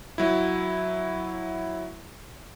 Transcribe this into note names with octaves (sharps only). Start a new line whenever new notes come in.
F#3 E4